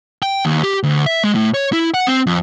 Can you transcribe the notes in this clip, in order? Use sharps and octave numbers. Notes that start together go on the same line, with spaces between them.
G5
D#2
G4
D2
E5
G#3
A2
C#5
E4
F#5
C4
F2